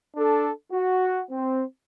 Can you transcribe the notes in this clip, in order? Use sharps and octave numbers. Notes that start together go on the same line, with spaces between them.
D4 A4
F#4
C4